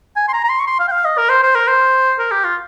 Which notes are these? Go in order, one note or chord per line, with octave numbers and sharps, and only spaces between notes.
G#5
C6
A#5
A#5
C6
C#6
C6
F5
G5
F5
D#5
A#4
C5
C5
A#4
C5
A#4
G4
F4